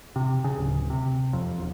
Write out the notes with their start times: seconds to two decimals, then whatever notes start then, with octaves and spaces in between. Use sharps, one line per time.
0.16 C3
0.44 C#3
0.57 D1
0.90 C3
1.33 F2
1.58 E1